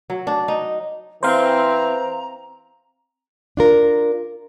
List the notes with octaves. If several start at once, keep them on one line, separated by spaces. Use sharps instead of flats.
F#3
D4
D#4
E3 C4 C5 F5 A#5
D4 F4 A#4